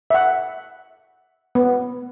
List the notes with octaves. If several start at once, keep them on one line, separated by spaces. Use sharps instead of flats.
E5 F#5
B3